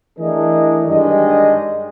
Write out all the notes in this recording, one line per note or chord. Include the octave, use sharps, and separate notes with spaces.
E3 A3 D4 G#4 A#4 D#5
G2 D#3 G#3 D4 G4 D#5